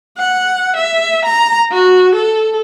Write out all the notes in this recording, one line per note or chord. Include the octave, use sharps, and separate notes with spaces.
F#5
E5
A#5
F#4
A4